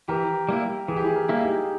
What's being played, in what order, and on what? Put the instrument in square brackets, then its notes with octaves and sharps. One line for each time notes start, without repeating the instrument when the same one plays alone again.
[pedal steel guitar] E3 [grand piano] G4 A#4
[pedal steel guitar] G3 A#3 E4
[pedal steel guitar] E3 [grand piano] G#4
[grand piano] G4
E4 G#4
G4 A#4
[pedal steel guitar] G3 A#3 E4
[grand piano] D#4 G4